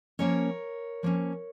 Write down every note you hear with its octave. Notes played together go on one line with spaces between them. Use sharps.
F3 A#3 C#4 A#4 C#5
F3 A#3 C#4